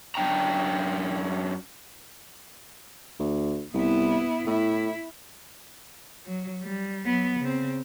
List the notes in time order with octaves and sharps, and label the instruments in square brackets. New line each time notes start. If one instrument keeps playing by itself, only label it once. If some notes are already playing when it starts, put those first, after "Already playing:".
[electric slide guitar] F#2 D4 G5 A#5
[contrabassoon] D2
[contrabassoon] C2 [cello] B3 E4
[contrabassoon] A2 [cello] E4
[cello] F#3
G3
F#3 B3
C#3 C4